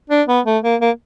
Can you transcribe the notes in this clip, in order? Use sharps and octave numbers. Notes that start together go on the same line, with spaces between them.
D4
B3
A3
A#3
A#3